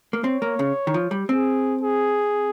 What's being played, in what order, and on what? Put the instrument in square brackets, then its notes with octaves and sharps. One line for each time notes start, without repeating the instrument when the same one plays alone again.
[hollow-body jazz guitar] A#3
[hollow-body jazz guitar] C4 [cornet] C#5
[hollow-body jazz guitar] A#3
C#3
D#3
F3
G3
[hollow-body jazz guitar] C4 [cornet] G#4
[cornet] G#4